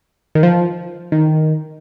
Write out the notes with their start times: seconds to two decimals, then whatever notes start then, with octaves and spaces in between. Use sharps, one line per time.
0.35 D#3
0.43 F3
1.12 D#3